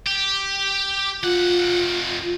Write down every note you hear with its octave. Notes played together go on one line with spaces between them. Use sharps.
G4
F2 F4 F#5